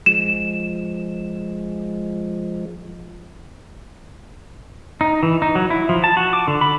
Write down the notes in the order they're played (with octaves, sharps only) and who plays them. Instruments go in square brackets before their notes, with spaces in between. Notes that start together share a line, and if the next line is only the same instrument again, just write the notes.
[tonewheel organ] F3 G#3 [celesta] E7
[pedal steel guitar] D#4
E3
D#4
F#3
E4
F3
A5
F#4
D6
D3
B5